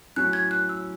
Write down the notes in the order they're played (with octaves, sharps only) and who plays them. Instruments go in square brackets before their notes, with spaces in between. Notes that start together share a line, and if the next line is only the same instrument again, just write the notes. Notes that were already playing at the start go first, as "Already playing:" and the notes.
[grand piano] A2 F#3 C#4 [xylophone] F#6
[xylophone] G#6
F#6
E6